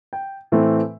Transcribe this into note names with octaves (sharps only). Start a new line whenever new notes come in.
G5
A2 E3 A3 C4